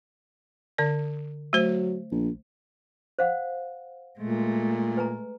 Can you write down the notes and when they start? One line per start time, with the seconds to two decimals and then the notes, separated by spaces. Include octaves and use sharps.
0.78 D3 D5
1.53 F#3 A3 C5
2.12 A#1
3.19 C5 F5 F#5
4.19 A#2 G#3 A3
4.97 B4 G#5 A#5